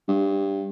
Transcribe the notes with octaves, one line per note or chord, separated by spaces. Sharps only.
G2